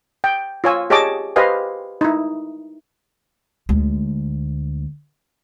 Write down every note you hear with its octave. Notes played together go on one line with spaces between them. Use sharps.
G5
F4 C#5 G#5 E6
G4 G#4 C#5 D#5 A5 D6
G4 B4 C5 D#5 F5 G#5
D#4 E4
D2 G#3